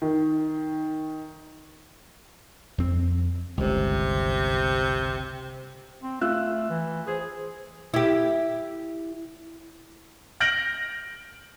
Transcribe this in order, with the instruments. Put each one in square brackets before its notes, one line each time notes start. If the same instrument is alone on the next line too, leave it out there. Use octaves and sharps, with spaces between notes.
[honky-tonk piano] D#3
[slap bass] F2 C4
[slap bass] G1 C#2 [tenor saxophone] C3
[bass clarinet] C4
[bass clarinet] A3 [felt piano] F4 E6 F#6
[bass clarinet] E3
[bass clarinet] G#4 [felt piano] C5
[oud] E4 G4
[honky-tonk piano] F6 G6 A#6 D7 F#7